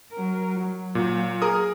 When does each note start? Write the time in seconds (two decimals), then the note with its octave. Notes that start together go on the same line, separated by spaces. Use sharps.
0.12 F#3 A#4
0.54 F#3
0.95 A#2
1.42 G#4 A#4 D#6